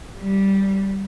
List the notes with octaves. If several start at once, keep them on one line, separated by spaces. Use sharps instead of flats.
G3